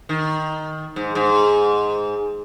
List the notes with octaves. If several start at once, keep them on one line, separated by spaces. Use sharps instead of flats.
D#3
G#2
G#2